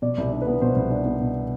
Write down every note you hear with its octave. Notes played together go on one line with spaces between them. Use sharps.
B2 D5
C2
D5
D4
B4
B3
B2 C5
C2
D4
B3
B2